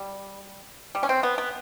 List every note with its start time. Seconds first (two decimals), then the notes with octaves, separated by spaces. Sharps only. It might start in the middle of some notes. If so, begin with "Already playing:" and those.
Already playing: G3
0.95 G3
1.03 C#4
1.09 C4
1.23 B3
1.38 B3